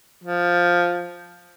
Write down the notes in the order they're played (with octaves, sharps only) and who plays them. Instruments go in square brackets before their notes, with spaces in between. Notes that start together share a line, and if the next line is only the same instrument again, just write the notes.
[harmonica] F3